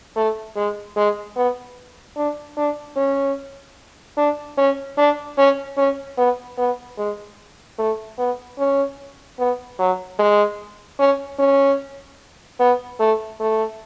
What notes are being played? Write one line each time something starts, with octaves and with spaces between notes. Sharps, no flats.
A3
G#3
G#3
B3
D4
D4
C#4
D4
C#4
D4
C#4
C#4
B3
B3
G#3
A3
B3
C#4
B3
F#3
G#3
C#4
C#4
B3
A3
A3